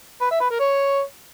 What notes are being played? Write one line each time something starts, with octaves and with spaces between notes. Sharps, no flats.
B4
E5
B4
A#4
C#5